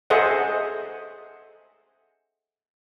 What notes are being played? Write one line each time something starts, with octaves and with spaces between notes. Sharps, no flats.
G#4 A4 C5 D#5 E5 F#5